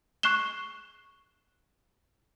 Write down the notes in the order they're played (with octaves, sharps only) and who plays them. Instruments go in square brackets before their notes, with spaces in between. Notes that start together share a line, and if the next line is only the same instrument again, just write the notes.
[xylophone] C#6 F#6 C7 E7 G7